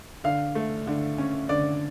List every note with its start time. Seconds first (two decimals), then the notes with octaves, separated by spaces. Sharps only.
0.24 D3 F5
0.55 A3
0.87 D3
1.18 C#4
1.49 D3 D5